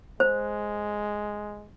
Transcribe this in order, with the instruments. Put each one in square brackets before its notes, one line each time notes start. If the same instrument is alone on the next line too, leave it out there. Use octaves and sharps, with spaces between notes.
[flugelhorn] G#3 [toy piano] C5